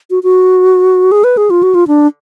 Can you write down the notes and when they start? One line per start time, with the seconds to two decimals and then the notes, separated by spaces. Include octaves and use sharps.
0.10 F#4
0.23 F#4
1.12 G#4
1.24 B4
1.37 G#4
1.50 F4
1.63 F#4
1.75 F4
1.88 D4